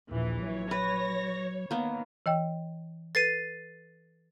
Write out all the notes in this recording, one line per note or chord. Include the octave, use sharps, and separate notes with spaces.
A#1 D#2 A#2 E3
F#3 C#5
B4 A#6
D#3 A#3 B3
E3 D#5 G5
A4 B4 A6 C7 D#7